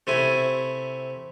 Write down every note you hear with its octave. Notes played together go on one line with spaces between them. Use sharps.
C3 A3 E4 G#5